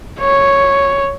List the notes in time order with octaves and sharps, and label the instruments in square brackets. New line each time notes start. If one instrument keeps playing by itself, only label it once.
[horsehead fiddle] C#5